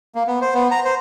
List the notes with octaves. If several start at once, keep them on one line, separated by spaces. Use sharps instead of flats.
A#3
B3
C5
B3
A#5
C5